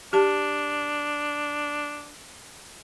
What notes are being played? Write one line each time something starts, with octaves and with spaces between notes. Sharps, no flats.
D4 G4 A5